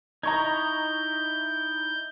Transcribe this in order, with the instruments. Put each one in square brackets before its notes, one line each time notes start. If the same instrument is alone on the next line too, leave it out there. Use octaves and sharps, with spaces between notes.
[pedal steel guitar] D#4 E4 D#5 [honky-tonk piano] A#5 C#6 G#6 [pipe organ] G6